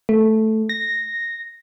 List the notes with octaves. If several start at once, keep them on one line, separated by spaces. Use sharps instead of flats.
A3
A#6